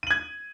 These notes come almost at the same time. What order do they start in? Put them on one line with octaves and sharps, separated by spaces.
D#7 F#7 G#6